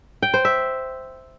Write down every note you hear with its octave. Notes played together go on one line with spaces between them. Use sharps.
G5
C5
E5